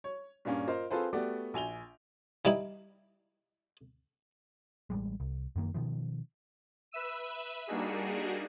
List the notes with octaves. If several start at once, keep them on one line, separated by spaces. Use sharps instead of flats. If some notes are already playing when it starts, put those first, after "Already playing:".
C#5
G2 A#2 A#3 C#4
F4 A#4 C5 D#5 F5
C4 F4 G#4 A4 B4 C5
A3 B3 F#4 G4 D5
A#1 G#5 F7 G7
E3 G3 D#4 E4
A1 G3 G#3
C2
F#2 D#3 A#3
B2 D#3 F3
B4 E5 E6 D#7
G3 A#3 D4 D#4 F#4 G#4